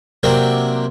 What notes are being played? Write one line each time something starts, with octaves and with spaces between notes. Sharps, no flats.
C3 F#3 A#3 C4 D4